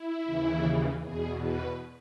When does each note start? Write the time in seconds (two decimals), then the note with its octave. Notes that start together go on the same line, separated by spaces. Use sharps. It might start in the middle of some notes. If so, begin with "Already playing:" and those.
Already playing: E4
0.24 D#2 C#3 E3
1.01 E2 B2 G#4
1.39 B4